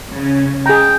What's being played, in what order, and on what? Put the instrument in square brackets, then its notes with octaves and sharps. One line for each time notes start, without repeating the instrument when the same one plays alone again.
[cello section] C#3 C#4
[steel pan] G#4 A#5 [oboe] G5